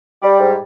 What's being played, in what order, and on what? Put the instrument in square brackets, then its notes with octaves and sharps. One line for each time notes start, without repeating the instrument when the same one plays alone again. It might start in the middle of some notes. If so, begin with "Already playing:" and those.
[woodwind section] G3 D5
G#2